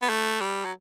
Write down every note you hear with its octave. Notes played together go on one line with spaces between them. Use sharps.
B3
A3
G3
F#3